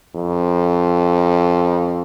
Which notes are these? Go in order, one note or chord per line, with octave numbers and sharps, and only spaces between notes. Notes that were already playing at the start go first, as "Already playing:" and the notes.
F2